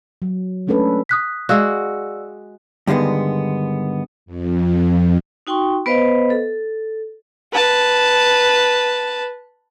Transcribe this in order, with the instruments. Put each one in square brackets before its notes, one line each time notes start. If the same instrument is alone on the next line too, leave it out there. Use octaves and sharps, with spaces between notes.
[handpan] F#3
G#3 A3 C#4 D4 A4 B4
[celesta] D#6 F#6 B6
[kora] G#3 F#4 [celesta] D5 F5 E6
[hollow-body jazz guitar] G2 D3 D#3 G#3 B3
[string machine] F2
[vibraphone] D#4 F#4 G5 C6 C#6
B3 B4 C5 D#5 F5
A4
[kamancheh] B4 A5